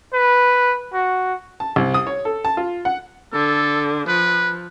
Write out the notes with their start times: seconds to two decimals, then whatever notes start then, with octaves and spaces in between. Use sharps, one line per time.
0.13 B4
0.93 F#4
1.60 A5
1.76 C2
1.94 D#6
2.07 C#5
2.25 A4
2.45 A5
2.57 F4
2.85 F#5
3.33 D3 A4
4.08 F3 B4